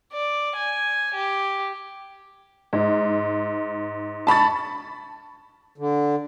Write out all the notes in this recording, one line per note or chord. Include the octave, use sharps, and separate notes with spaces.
D5
G#5
G4
G#2
A5 B5 C#6 A6
D3